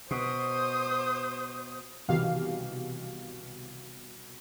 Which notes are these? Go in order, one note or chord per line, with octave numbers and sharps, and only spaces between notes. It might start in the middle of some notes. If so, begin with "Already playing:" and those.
B2 C5 D#6
C2 B2 D#3 E3 G4 F5